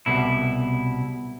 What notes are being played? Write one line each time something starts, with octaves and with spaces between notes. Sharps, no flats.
C2 B2 E4